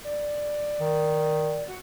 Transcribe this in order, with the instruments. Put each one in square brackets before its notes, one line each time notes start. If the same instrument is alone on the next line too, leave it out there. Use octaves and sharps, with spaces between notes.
[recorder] D5
[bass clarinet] D#3
[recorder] F#4